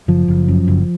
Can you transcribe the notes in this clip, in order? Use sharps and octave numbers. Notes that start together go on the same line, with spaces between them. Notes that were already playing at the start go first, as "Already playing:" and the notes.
F#1 F3
F#1
F#2
F#1